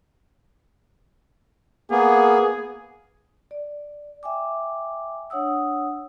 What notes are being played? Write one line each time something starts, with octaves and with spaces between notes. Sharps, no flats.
A#3 B3 G#4
D5
E5 G5 G#5 D6
D4 C#5 F#5 D#6 E6